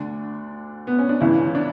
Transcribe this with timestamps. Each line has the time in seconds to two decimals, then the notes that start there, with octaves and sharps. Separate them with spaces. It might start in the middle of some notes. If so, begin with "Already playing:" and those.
Already playing: D2 D3 D4
0.87 B3
0.99 C#4
1.09 D4
1.21 C#2 C#3 E3 E4
1.55 D4